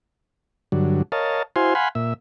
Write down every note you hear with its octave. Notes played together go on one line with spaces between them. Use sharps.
G2 D3 F#3
A#4 C#5 D#5 F5 A5
E4 F#4 C5 F5 G#5 C6
F5 F#5 G#5 B5 C6
A#2 E5